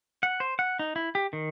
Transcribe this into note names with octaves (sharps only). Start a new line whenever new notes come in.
F#5
C5
F#5
D#4
E4
G4
D#3